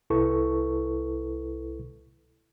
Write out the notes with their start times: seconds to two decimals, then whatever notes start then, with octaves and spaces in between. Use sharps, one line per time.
0.10 C2 E4 A4 B4 C#6